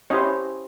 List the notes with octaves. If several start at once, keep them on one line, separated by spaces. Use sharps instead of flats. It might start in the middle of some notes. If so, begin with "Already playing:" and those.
C#4 E4 G4 C5 C#5 D#5